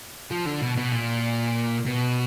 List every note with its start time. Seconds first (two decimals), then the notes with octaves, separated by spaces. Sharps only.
0.31 F3
0.46 D3
0.62 B2
0.77 B2
0.92 A#2
1.85 B2